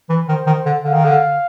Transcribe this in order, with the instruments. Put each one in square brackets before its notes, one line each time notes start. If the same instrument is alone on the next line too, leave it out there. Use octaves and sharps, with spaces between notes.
[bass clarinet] E3
[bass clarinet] D#3 [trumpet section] C5
[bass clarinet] D#3
D3
[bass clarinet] D3 [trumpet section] F5
[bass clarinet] D#3
D3